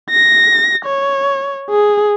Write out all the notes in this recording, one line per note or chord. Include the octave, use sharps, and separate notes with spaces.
A#6
C#5
G#4